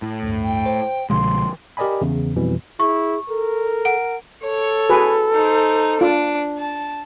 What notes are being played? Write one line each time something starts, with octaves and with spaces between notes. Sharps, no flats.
A2
D2 G2
G5
C5
C2 B2 D3 F3 G#3 C6
G4 A#4 D5 D#5 G#5 B5
E2 C#3
F2 B2 E3 G3
E4 G#4 C#6
A4 A#4
F#5 D7
A4 C#5
F#4 G#4 B4
D#4 C5
D4 F4
A5